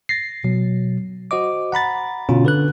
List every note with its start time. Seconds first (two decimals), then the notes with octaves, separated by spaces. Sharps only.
0.09 A6 A#6 C7
0.44 B2 F#3
1.31 F#4 C5 D#5 D6
1.72 F#5 A#5 B5 A6
2.29 B2 D3 C#4 F4 F#4
2.44 D3 B4 F#6